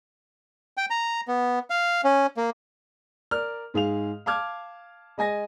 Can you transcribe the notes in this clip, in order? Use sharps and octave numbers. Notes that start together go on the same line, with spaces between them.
G5
A#5
B3
F5
C#4
A#3
A#4 D5 F6
G#2 G#4 F5 F7
F5 A5 D6 F6 G#6
G#3 D#5 G#5 A#6